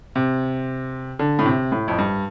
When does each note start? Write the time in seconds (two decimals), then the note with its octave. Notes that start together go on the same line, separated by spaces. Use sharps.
0.16 C3
1.19 D3
1.39 A2
1.46 C3
1.72 A2
1.88 F2
1.98 G2